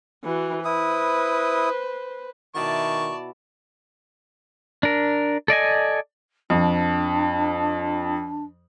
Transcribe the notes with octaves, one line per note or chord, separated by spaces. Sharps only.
E3 F#4
E4 B4 C5 D#6
B2 D#3 E4 F#4 D5 A5 C#6
D4 A#4
A4 D5 D#5 G#5
F2 D4